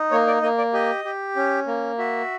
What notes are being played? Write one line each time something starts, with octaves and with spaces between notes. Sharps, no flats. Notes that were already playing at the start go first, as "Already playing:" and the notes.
Already playing: D#4
A#3 C#5
D5
A#3 D#5
D5
G4 D#5
G4
C#4
A#3
F#4 E5